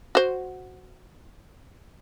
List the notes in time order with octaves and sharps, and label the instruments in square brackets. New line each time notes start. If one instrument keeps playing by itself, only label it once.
[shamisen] F#4 C5